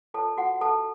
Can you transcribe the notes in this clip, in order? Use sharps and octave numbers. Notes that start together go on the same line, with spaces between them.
F4 A4 C#5 A5
F#4 F#5
A4 A5